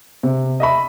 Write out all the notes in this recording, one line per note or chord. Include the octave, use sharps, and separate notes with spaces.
C3
D#5 E5 B5